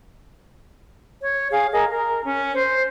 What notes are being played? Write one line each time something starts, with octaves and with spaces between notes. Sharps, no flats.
C#5
G#4 F5
G#4 A#4 D#5
A#4
C#4
C5